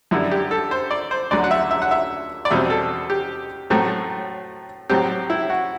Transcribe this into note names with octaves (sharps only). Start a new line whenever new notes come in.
F#2 D3 G3 E4
G4
A4
C5
D5
C5
D2 D3 F#3 D5
F#5
E5
E5
F#5
E5
D5
E2 B2 G3 C4 E5
A4
G4
A2 F#3 A3 C4
A2 F#3 C4 G4
E4
F#4